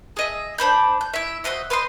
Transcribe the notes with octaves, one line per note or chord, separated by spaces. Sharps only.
G#4 D#5 E5
D4 C5 B5 G6
G6
E4 E5
F#4 C5 D#5 E5
B4 C5 D#5 C6